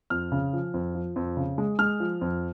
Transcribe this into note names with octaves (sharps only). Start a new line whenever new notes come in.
F2 F6
C#3
F3
F2
F3
F2
C#3
G#3
G#3 F6
F3
F2